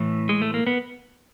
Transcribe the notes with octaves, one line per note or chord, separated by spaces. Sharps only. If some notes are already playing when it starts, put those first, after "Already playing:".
Already playing: A2 E3
G#3
A3
A#3
B3